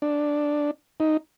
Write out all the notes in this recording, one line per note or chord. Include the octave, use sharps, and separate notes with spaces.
D4
D#4